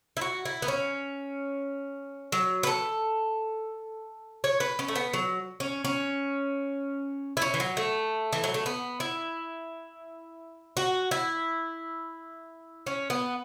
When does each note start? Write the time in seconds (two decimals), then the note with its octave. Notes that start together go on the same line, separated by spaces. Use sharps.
0.17 E4
0.21 F#4
0.45 E4
0.62 B3
0.68 C#4
2.32 F#3
2.63 B4
2.67 A4
4.44 C#5
4.60 B4
4.79 C#4
4.88 A3
4.95 B3
5.13 F#3
5.60 C#4
5.85 C#4
7.37 E4
7.42 C#4
7.54 E3
7.60 F#3
7.77 A3
8.33 E3
8.44 F#3
8.54 A3
8.66 B3
9.00 E4
10.77 F#4
11.11 E4
12.86 C#4
13.10 B3